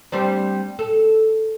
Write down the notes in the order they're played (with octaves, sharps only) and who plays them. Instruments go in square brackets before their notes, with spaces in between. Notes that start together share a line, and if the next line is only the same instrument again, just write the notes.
[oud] G3 C4 D4
A4